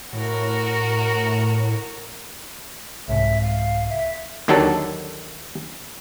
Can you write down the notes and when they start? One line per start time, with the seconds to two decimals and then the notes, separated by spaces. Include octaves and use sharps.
0.13 A2 F#4 A#4
3.08 C2 G#2 C3 E5
3.42 F5
3.90 E5
4.48 D#2 D3 D#3 F#3 D4 A4